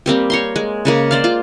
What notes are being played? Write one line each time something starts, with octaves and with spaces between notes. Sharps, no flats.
G3 A#3 C4 G4
C#5 A#5 C6
G#3
C#3 G#3 A#3
C5 D5 F5
F4